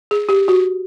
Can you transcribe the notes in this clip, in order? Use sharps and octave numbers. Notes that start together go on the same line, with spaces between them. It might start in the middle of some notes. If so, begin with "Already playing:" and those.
G#4
G4
F#4